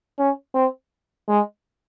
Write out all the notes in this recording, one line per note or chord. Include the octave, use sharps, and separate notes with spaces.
C#4
C4
G#3